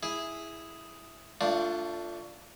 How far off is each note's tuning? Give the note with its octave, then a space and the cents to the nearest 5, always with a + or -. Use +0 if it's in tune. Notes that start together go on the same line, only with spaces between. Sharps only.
E4 +0 G#4 +0
A3 +30 D4 +0 F4 +0